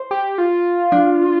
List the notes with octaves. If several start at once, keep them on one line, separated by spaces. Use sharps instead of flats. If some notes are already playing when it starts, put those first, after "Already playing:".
Already playing: C5
G4
F4
D4